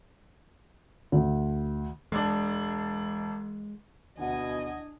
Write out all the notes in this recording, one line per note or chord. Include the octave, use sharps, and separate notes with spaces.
D2
E1 G#3 D4
D2 B2 D4 E4 D#5 F#5 G#5